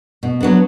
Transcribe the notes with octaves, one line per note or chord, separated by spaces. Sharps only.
B2
F#3 B3 D4